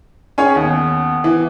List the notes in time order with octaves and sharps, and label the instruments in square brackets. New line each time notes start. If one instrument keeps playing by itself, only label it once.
[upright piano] C#4 G#4 C#5
[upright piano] D#2 [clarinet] B3
[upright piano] E3